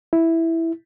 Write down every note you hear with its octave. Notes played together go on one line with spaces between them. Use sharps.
E4